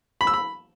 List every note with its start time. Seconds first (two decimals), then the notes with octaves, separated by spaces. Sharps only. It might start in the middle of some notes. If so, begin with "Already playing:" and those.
0.21 B5
0.27 E6
0.34 B5